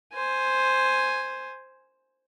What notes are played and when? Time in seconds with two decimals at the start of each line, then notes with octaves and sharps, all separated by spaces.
0.14 C5 G#5